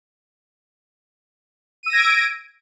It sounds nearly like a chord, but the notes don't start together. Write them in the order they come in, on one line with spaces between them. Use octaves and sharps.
D#7 E6 A#6 G#6 D7